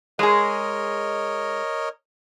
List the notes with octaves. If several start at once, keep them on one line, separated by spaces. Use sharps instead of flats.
G#3 G#4 A#4 C#5 D#5